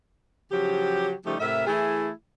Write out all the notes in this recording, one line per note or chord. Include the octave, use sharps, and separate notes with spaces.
C#3 F3 F#3 G4
C#3 F3 G3 A3 D#4 G4
A2 C3 A#4 E5
E3 A3 E4 G#4